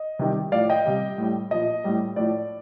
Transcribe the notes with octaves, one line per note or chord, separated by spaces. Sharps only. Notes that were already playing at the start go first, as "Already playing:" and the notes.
Already playing: D#5
C3 D#3 G3
A2 F3 D5 F5
D#5 G5
C3 G3
A2 G3
A#2 F3 D#5
A2 G3
A2 F3 D5